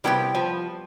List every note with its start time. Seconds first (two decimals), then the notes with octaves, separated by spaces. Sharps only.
0.04 C3 G3 B3 E4 G4 G5
0.35 F3